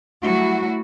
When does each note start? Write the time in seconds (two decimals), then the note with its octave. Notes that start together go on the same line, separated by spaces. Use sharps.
0.22 F#3 G3 A3 E4 F#4